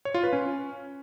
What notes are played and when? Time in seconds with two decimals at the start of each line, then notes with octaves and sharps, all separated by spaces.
0.05 C#5
0.14 F4
0.24 B4
0.33 C#4